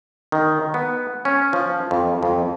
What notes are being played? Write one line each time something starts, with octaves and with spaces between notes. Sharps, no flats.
D#3
B3
C#4
F3
F2
F2